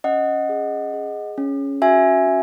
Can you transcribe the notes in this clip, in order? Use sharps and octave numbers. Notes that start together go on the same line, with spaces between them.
C#4 D#5 F#5
G#4
G#4
C#4
F#4 E5 G#5
C#4